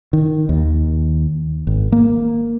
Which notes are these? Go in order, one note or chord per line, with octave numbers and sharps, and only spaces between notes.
D#3
D#2
G#1
A#3